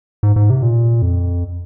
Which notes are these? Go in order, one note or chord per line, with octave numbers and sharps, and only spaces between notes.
G#2
G#2
C3
A#2
F2